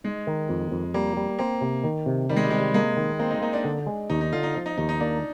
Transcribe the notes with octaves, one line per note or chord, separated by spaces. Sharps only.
G#3 D#4
D#3
F2
F2
G3 A#3
G3
A#3 C4
C3
D#3
C3
D#3 G3
G#3
G3
C3 G#3
G3
G#3 A#3
D#3
A#3 C4
D#4
A#3 D#4
D4
D3
G#3
D#2 D#4
D#4
D3 F4
D#4
F3 F4
D#4
D#2 D#4
D#4
A#3 D4